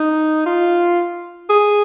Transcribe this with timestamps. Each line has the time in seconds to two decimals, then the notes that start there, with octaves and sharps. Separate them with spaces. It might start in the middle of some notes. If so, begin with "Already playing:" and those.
Already playing: D#4
0.46 F4
1.49 G#4